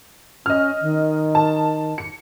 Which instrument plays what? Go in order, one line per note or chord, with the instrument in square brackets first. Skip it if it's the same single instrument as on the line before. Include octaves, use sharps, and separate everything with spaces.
[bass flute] C#4 [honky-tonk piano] D#5 F6
[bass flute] D#3
[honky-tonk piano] A5
C#7